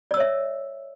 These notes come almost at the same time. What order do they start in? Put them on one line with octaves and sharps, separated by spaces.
D5 E6 C#5 E5